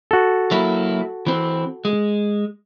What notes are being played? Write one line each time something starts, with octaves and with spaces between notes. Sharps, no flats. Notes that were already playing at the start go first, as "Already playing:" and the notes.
F#4 A4
F#3 A#3 E4
E3 C4
G#3